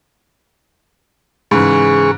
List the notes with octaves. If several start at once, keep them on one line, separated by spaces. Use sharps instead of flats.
G#2 C#3 E3 G#4 C#6